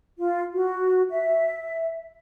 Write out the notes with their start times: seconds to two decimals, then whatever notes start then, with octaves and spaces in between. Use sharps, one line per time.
0.18 F4
0.53 F#4
1.10 E5